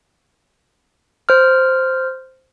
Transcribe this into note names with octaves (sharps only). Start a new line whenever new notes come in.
C5 F6